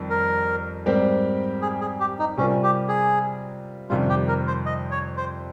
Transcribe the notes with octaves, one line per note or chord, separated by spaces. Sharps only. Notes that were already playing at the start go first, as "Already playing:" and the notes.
Already playing: F2 D#3 G3
A#4
G#2 G3 C4 G4 A#4
G#4
G#4
G4
D#4
C3 G3 C4 C#4 F4 A#4
G4
G#4
F2 C3 D#3 G3 F4
G4
A#4
C5
D#5
C#5
C5